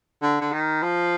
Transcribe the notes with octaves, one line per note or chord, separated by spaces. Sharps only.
D3
D3
D#3
F3